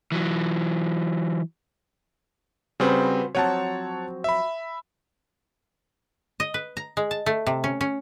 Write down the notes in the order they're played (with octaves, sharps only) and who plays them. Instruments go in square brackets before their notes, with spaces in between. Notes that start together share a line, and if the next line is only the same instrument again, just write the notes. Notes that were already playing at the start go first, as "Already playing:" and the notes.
[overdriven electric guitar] E3 F#3
[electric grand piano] C#3 G3 C4 [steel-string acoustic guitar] F#4 B4 C5
[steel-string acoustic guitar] F3 F#3 C4 [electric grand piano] C#5 F#5 A5
[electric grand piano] E5 B5
[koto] D#5
B4
A#5
G#3
A5
A3
C3
C#4
C#4